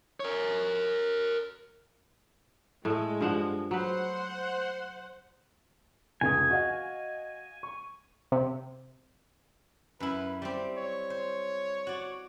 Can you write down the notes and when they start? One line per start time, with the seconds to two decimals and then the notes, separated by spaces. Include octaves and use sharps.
0.20 A#4 C#5
2.85 A2 G#3 A3
3.21 G2 F3 F#5
3.71 F#3 B4 C5 F#5
6.21 F1 C#2 G#5 D#6
6.51 F#4 D#5 F5
7.63 C#6
8.32 C3
10.00 F#2 E4 B4
10.42 G3 C4 G4
10.78 C#5
11.10 C5
11.87 F#4 D5